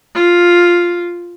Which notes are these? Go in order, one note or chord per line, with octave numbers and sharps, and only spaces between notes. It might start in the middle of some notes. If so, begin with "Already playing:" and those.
F4